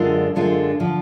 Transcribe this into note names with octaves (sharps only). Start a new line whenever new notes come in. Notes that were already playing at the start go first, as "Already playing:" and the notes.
Already playing: F#2 D3 G#3 D4 F4
F#2 D3 G#3 D4 F4
D3 F3